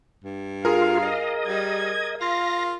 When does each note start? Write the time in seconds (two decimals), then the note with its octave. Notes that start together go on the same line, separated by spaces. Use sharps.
0.24 G2
0.65 F4 G#4 A#4 F5
1.03 D#5
1.47 G3 G#6
2.21 F4 F5 A#6